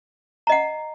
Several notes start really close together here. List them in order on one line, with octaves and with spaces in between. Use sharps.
A#5 D#5 F#5